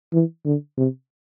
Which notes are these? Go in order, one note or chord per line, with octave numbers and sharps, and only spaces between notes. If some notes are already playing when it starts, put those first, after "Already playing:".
E3
D3
C3